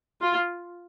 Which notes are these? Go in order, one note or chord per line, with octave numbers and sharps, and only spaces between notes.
F4